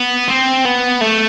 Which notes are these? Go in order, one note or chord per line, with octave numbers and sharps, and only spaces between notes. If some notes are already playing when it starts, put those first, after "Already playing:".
Already playing: B3
C4
B3
A3